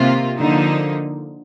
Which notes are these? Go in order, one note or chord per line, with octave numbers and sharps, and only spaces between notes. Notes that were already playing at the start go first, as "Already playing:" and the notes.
Already playing: C3 D#3 A#3 F4
D3 F3 A#3 D#4